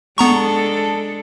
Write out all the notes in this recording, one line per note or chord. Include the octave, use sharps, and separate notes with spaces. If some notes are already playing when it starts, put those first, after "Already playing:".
G#3 B3 D4 A4 A#5 C#6